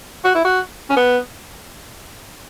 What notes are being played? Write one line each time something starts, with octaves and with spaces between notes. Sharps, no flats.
F#4
E4
F#4
C#4
B3